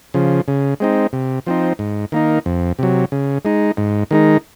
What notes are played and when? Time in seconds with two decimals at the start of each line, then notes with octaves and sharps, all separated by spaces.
0.14 C#3 F3
0.48 C#3
0.80 G#3 C4 D#4
1.13 C3
1.46 F3 C4 D#4
1.79 G#2
2.12 D#3 A#3 D#4
2.46 F2
2.79 C3 F#3
3.12 C#3
3.45 G#3 D#4
3.77 G#2
4.11 D#3 G#3 D#4